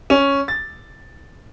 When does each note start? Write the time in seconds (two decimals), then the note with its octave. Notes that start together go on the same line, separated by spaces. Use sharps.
0.10 C#4
0.48 A6